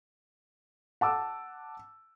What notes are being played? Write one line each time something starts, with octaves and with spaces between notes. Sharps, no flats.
F#5 A5 D6 E6